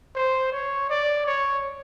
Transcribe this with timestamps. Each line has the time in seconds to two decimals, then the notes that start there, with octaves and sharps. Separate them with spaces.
0.15 C5
0.52 C#5
0.90 D5
1.26 C#5